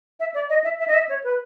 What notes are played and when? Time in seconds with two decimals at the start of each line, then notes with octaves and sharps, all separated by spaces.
0.20 E5
0.34 D5
0.50 D#5
0.64 E5
0.79 E5
0.88 D#5
0.94 E5
1.09 C#5
1.24 B4